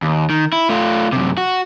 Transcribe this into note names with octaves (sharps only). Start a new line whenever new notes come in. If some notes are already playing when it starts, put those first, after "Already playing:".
D#2
D#3
E4
A3 F4
F#2 C3
F#4